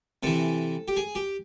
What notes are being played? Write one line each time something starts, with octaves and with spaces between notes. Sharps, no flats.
C3 E3 A4
G4
G#4
G4